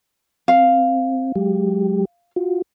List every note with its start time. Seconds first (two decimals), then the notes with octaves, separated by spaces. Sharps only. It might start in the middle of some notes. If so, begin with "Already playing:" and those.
0.48 C4 F5
1.35 F#3 G#3 G4
2.36 F4 F#4